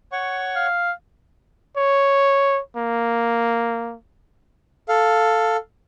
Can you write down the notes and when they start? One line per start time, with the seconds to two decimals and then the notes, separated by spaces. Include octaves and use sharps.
0.12 C#5 F#5 C#6
0.56 F5
1.77 C#5
2.76 A#3
4.88 A4 F5